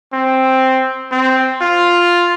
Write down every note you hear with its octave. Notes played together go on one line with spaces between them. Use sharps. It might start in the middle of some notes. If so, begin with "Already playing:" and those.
C4
C4
F4